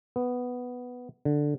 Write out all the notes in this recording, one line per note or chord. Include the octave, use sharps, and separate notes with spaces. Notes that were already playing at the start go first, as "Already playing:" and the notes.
B3
D3